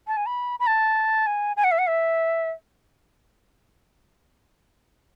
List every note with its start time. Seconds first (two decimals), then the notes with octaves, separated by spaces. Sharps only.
0.07 A5
0.17 G#5
0.26 B5
0.60 B5
0.67 A5
1.27 G#5
1.56 G#5
1.64 F#5
1.71 E5
1.78 F#5
1.87 E5